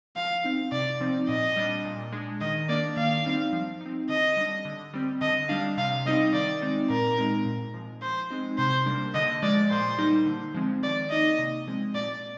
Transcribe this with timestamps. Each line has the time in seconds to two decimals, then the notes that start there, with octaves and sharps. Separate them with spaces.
0.16 F3 F5
0.44 C4 D#4
0.72 C3 D5
1.00 F3 C4 D#4
1.28 A#2 D#5
1.56 G3 D4
1.85 A#2
2.12 G#3 D4
2.41 D#3 D#5
2.69 A#3 D4 D5
2.97 D#3 F5
3.25 G3 C4 D#4
3.53 F3
3.81 C4 D#4
4.09 D3 D#5
4.37 G3 D4
4.65 D3
4.94 G3 C4
5.21 D3 D#5
5.49 G3 D4 F5
5.77 C3 F5
6.06 G3 C4 D#4 D#5
6.34 D#3 D5
6.62 G#3 C4 D#4
6.90 A#2 A#4
7.18 G#3 C4 D#4
7.45 A#2
7.74 F3 G#3
8.02 F3 C5
8.30 G#3 C4 D#4
8.58 C3 C5
8.86 G3 A#3 D4
9.14 D3 D#5
9.43 F3 G#3 D5
9.70 A#2 C5
9.99 G3 A#3 D#4
10.26 D3
10.54 F3 G#3 C4
10.82 D#3 D5
11.10 A#3 D#4 D#5
11.38 C3
11.67 F3 G#3 C4
11.95 A#2 D5